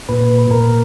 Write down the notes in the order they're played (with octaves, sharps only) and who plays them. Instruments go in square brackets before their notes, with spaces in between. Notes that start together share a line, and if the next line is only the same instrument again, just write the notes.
[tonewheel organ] A#2 B4
A#2 A#4